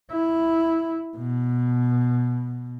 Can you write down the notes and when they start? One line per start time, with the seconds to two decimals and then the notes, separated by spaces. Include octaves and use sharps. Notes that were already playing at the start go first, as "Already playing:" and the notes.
0.11 E4
1.17 B2